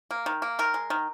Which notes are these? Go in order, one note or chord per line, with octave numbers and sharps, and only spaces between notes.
A#3
D#3
A#3
D#3 A#4
G#3
D#3